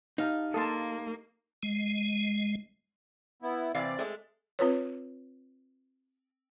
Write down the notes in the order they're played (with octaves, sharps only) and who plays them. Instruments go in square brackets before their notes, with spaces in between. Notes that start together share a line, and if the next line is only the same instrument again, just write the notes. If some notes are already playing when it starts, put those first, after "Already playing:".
[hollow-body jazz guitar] D#4 [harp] G4 F5 A5
[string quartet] A#3 [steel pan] A4 F5 A5 [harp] C6 D#6
[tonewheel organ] G#3
[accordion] B3 E4
[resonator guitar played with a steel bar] C3 E3 F5 [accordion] C4 D5
[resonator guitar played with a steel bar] G#3 A3
[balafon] C4 F4 B4 C#5